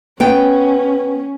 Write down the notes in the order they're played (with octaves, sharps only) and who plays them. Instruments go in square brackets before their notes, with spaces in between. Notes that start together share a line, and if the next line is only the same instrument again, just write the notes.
[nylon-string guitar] B3 G5 [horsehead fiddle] C#4